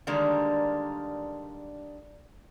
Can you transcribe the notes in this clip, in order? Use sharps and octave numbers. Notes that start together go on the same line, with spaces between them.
D3 D#3 G3 G#3 A#3 D4